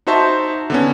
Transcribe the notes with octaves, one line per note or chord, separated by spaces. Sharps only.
D#4 F#4 C5 E5 A5
D3 B3 C#4